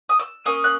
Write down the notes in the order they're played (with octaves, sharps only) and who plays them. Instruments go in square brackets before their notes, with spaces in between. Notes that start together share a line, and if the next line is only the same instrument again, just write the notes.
[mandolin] D#6
E6
A#3 C#4 D#6
F#6